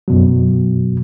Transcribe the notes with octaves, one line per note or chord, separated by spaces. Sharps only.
F#2 B2 F#3